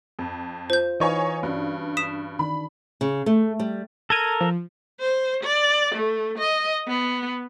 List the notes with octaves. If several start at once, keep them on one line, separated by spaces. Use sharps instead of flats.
F2
F4 C5 G6
E3 D#4 B4 C#5 F5 G#5
G2 C#4 D4 F#4
D#6 B6 E7
D#3 D4 B5
C#3
A3
G3
A4 A#4 A#5 G#6 D#7
F3
C5
D5
A3
D#5
B3